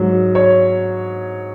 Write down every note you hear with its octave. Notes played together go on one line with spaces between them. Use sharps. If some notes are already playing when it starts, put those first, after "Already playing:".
Already playing: G#2 F#3
C#5